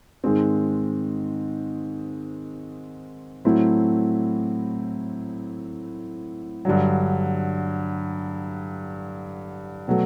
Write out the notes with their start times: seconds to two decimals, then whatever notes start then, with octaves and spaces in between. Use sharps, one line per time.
0.24 G#2 D#3 G#3 C4
3.45 A2 F#3 A3 C4 E4
6.65 G2 D3 F#3
9.88 B2 F#3 A3